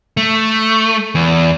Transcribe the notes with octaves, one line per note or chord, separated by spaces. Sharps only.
A3
E2